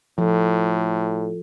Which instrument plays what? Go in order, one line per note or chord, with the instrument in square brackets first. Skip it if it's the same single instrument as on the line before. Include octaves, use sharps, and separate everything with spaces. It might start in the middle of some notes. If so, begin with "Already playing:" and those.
[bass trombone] A2 [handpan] F3 [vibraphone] F4 G4 A4